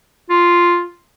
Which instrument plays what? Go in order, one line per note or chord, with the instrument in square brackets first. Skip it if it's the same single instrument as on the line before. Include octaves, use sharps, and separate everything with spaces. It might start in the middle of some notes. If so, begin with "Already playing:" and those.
[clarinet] F4